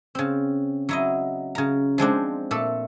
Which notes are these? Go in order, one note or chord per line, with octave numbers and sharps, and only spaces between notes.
C#3 C4
F#3 E4 D#5
C#3 A#5
F3 G#3 C4 D4
A#2 A3 A4